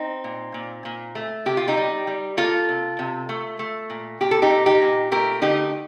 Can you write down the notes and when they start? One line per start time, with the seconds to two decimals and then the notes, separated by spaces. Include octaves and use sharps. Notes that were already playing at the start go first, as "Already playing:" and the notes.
Already playing: C4 D#4
0.24 A#2
0.54 A#2
0.85 A#2
1.15 A3
1.46 C3 G4
1.57 F4
1.68 D#4 G4
1.77 G3
2.07 G3
2.37 A#3 F4 A4
2.69 C3
2.99 C3
3.29 A3
3.59 A3
3.90 A#2
4.21 A#2 G4
4.31 A4
4.42 D#4 G4
4.50 A#2
4.66 D#4 G4
4.82 A#2
5.12 A3 G4 A#4
5.42 D3 D#4 G4